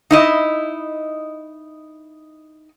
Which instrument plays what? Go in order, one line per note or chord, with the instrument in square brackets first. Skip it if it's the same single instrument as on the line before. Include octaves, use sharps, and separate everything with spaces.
[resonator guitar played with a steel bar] D#4 E4 D#5